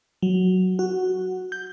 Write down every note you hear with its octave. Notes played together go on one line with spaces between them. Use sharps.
F#3
F#4
G6